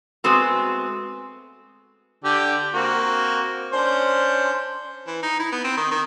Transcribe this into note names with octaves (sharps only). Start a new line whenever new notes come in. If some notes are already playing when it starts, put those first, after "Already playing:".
G#3 A3 B3 C4 F#4
D3 G4
A#3 C4 F#4
C#4 D4 C5
E3
D#4
E4
B3
C4
D#3
D#3